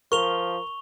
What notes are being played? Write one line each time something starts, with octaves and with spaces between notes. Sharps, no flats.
F3 A#4 C#6 F7 G7